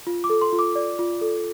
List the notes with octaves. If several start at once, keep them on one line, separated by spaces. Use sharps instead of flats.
F4
D6
A4
C6
F4
D6
D5
F4
A4